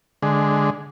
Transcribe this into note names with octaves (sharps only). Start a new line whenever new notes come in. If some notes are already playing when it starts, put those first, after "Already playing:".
D3 G#3